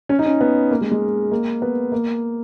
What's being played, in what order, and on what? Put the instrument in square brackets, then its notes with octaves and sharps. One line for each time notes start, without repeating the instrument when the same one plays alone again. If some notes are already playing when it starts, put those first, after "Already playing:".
[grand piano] C#4
D#4
C#4
B3
A#3
G#3
G#3
A#3
B3
A#3